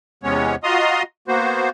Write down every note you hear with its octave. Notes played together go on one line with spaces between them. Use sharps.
E2 C3 G#3 B3 C#4 C#5
F4 F#4 D#5 A#5 C6 D#6
A#3 B3 F#4 C5